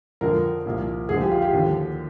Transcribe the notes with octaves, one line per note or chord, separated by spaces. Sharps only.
F2 D3 F3 A#4
C2 A#2 F3
D2 D3 F3 G#4
G4
F4
G4
D#2 D3 F3